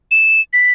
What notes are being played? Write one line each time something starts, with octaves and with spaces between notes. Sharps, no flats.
E7
B6